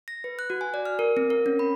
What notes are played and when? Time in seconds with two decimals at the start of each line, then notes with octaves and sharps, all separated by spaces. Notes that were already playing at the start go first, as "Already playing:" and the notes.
0.08 A#6
0.24 B4
0.39 F#6
0.50 F#4
0.61 G#5
0.74 D5
0.85 F6
0.99 A#4
1.17 C4
1.30 A#4
1.46 C#4
1.59 B5